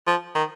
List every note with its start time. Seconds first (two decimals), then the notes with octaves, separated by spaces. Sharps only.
0.07 F3
0.35 D#3